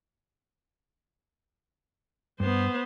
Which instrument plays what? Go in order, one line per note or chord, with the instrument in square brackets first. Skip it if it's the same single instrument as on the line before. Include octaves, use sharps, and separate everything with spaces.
[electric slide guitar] G2 [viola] B3 C5